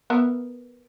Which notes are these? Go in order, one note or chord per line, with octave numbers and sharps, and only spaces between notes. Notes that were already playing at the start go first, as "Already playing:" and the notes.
B3 A#4 E5